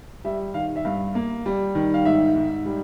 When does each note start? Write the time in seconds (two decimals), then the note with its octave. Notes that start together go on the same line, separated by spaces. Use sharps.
0.24 G3 E5
0.54 D#3 F5
0.76 E5
0.85 G2 F5
1.15 A#3
1.46 G3
1.75 D#3
1.94 F5
2.05 G#2 E5
2.35 G#2
2.65 G3